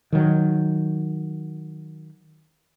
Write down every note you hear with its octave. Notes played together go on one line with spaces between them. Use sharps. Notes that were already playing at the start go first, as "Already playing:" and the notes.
D#3 F#3